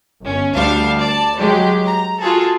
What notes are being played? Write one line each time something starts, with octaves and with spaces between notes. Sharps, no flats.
G1 C#4
D2 G3 D4 F5
D5 A5
F#3 G#3 G4
A#5
F4 F#4 G#4 A4